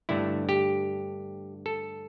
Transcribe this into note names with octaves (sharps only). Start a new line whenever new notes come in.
G2 D3 A3 E4
G4
A4